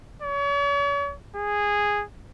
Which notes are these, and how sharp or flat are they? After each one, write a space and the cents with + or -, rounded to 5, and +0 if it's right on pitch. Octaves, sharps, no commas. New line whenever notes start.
C#5 +40
G#4 -10